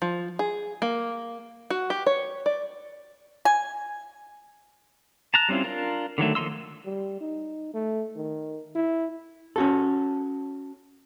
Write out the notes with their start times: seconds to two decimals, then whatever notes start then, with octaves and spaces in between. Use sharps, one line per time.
0.02 F3
0.39 G#4
0.82 A#3
1.70 F#4
1.90 G4
2.06 C#5
2.46 D5
3.45 G#5
5.34 A5 A#5 F#6
5.49 G3 C4 C#4 E4 F4
5.64 D4 F4 A#4
6.18 D3 D#3 F#3 A3
6.35 F3 A#3 D#4 C6 E6
6.85 G3
7.21 D#4
7.74 A3
8.16 D#3
8.75 E4
9.56 C#4 F#4 A4